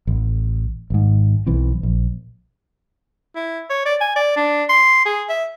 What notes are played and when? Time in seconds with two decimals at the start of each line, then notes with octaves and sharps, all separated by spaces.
0.07 A1
0.90 G#1 G#2
1.46 B1 E3 C4
1.83 A#1
3.36 E4
3.70 C#5
3.86 D5
4.01 G#5
4.16 D5
4.37 D4
4.69 C6
5.05 G#4
5.29 E5